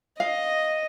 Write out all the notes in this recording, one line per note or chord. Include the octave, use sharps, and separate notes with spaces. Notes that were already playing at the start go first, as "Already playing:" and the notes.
D#5 F5